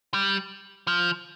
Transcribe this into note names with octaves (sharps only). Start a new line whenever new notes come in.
G3
F3